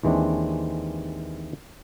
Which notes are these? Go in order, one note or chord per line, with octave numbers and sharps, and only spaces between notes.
D#2 E3 G#3 C4 D4